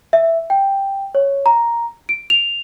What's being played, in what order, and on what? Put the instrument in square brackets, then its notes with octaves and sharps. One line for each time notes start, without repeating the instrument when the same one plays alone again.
[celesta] E5
G5
C#5
A#5
D7
F7